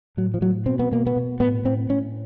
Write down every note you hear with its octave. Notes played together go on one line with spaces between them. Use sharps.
A2 F#3
F3
A2 F#3
B2 C4
B3
B2 A#3
B3
B2
A2 B3
A2 C4
A2 C#4